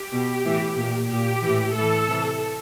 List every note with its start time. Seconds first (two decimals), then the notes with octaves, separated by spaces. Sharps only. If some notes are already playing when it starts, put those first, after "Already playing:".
Already playing: G4
0.12 B2
0.44 A2 E3
0.78 A#2
1.10 A#2 G4
1.43 A2 E3
1.75 A2 E3 A4
2.08 C3 E3